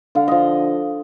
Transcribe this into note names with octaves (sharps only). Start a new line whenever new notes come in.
D3 F5
F3 D#5